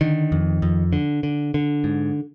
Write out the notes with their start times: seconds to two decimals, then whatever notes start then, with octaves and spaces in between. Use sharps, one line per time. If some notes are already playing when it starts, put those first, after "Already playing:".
0.01 D3 D#3
0.32 F2
0.62 F2
0.93 D3
1.23 D3
1.54 D3
1.84 G#2